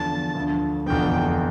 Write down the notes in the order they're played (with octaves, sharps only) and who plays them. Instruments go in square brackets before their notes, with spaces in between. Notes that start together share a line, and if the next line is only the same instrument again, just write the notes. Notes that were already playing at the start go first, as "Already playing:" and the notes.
Already playing: [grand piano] E2 D3 F3 [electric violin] A5
[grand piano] D2 D3 F3
[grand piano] F1 E2 D3 F3 [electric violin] G5